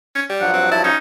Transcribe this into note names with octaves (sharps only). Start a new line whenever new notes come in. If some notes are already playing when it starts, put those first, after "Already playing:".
C#4
G3
G2 F3 F#3 F#5
C4
E4 A5
C#4 D#4